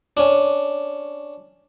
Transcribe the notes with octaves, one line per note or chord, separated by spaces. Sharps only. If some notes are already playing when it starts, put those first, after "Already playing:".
C#4 D4